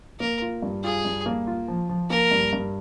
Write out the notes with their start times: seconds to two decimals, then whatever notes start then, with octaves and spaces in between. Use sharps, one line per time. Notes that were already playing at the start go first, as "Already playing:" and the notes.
0.20 A#3 A#4
0.42 F4
0.62 G2
0.84 F4 G#4
1.05 G2
1.26 A#3
1.47 F4
1.68 F3
1.89 F3
2.10 A#3 A#4
2.31 G2
2.53 G2